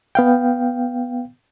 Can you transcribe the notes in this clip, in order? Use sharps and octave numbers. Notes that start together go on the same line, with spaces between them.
B3 F5 G5